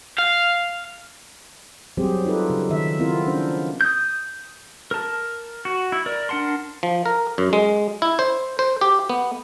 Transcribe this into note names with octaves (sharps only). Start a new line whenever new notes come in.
F5
F#3 G3 C4 G4 G#4 C5
D#4 F4 A4 B4
C#3
D#3 E5
B3 C4 E4 F4 A#4
C#4 D4 C5
D#6 G6
A#4 A5
F#4
E4
A#4 D5
D4 A#4 F#5 A5 C6
F3
A#4
F#2
G#3
E4
C5
C5
G4
B3